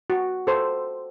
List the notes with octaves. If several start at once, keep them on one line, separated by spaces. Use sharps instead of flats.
F#4
A4 C5